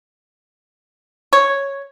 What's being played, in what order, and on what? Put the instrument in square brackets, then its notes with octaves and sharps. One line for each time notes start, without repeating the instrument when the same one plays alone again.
[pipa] C#5